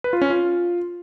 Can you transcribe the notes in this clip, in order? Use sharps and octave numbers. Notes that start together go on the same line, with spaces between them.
B4
F4
C#4
F4